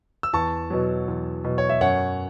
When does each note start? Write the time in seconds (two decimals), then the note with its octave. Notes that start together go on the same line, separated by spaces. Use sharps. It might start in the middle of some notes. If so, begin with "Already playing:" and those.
0.23 E6
0.33 E2 A5 C#6
0.70 B2 F#3
1.08 E2
1.44 B2 F#3
1.58 C#5
1.69 E5
1.81 F#2 C#5 F#5